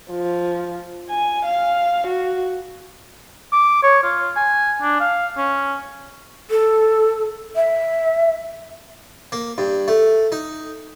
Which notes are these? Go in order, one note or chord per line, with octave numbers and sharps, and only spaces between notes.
F3
G#5
F5
F#4
D6
C#5
F4
G#5
D4
F5
C#4
A4
E5
A#3
G2
A3
D#4